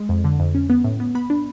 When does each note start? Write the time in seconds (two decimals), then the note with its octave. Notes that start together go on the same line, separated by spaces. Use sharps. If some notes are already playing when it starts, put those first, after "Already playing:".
Already playing: G#3
0.09 F2
0.24 D3
0.40 F2
0.55 C#4
0.70 B3
0.84 A2
1.00 B3
1.15 B3 B5
1.30 D4